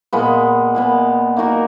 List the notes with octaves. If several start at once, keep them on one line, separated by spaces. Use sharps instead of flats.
A#2 G#3 B3
A#2 G#3 B3
A#3 D#4 F#4 A#4